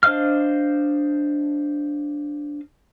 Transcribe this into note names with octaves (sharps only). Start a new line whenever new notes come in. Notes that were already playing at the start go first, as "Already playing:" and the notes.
D4 C5 D#5 F5 F6